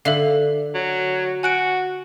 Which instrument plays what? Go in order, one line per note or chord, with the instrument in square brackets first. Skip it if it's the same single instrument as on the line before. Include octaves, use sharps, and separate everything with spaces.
[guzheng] D3 [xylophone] A4 E5 F5
[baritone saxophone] F#3
[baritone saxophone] F#4 [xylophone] G#5 F#6 D7